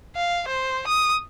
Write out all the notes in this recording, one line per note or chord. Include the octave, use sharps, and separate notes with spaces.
F5
C5
D#6